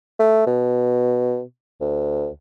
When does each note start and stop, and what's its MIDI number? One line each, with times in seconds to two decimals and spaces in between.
0.19 0.46 57
0.46 1.41 47
1.81 2.28 38